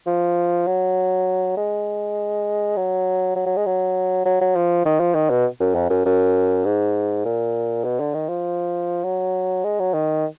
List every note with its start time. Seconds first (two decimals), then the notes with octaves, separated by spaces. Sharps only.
0.07 F3
0.67 F#3
1.57 G#3
2.77 F#3
3.36 F#3
3.46 F#3
3.56 G#3
3.66 F#3
4.25 F#3
4.41 F#3
4.55 F3
4.85 D#3
5.00 F3
5.15 D#3
5.30 B2
5.60 F#2
5.75 F2
5.90 F#2
6.05 F#2
6.65 G#2
7.25 A#2
7.84 B2
8.00 D3
8.14 D#3
8.29 F3
9.04 F#3
9.64 G#3
9.79 F#3
9.94 D#3